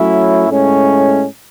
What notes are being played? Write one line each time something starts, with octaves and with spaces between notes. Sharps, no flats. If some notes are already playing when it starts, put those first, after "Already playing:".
Already playing: F#3 A3 C#4 E4
A2 G#3 C#4